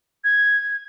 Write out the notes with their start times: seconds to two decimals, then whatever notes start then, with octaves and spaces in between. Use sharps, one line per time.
0.24 G#6